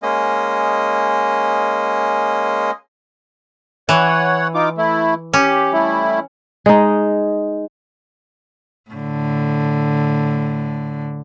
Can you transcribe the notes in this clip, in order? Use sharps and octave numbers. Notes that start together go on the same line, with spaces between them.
G#3 A#3 C#4 D#5
E3 C#5 F#5
D#4 F4 D6
A3 E4
C#4 G4
G3 A3 E4
G#3 D#4
A2 D3